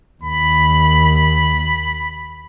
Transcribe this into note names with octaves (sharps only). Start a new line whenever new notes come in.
D#2 B5